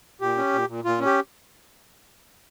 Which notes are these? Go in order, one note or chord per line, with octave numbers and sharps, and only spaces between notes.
A#2 G4
C#4
A#2
A#2
A#2 F4
C#4
G4